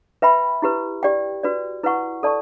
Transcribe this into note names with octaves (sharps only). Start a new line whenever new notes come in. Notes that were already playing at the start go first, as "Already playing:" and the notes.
B4 E5 G5 B5
E4 G4 B4
G4 D5 G5
F#4 B4 D5
E4 B4 F#5 C#6
A4 D5 A5 C#6